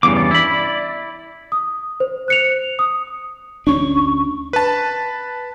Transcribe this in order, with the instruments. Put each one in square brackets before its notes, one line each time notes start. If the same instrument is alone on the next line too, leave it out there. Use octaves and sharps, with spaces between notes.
[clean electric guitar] E2 G2 C#3 [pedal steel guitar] D6
[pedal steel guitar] D5
[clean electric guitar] E4 B5
[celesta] D#6
C5
F#6 C#7 F7
D#6
[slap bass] D2 C#4 D4 [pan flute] C#6
[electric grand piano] B4 A5